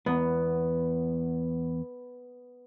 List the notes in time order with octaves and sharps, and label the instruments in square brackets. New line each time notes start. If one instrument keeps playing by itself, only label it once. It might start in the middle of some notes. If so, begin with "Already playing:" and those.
[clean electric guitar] E2 [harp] B3